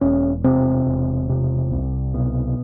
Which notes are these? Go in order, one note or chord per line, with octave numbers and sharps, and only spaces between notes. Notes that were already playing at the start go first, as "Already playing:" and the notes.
E1 C#4
C3 C4
E1
C3
C2
B2